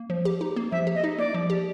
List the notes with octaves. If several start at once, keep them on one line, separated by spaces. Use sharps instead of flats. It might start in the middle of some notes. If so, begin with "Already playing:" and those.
Already playing: A#3
F3
G4
D#4
A#3
F3 E5
G4
D#5
D#4
A#3 D5
F3
G4